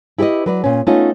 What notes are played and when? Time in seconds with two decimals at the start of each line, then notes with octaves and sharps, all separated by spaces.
0.18 E4 G4 G#4 B4 D#5
0.46 F#3 B4 D5
0.64 A#2 C#4
0.87 A3 B3 C#4 D#4 F4